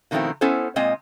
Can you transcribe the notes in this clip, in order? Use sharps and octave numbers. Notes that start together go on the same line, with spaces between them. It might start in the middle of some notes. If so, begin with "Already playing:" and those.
B2 D#3 F3 A3 C4 E4
B3 C#4 E4 A4 C5
A#2 G#3 C4 D#5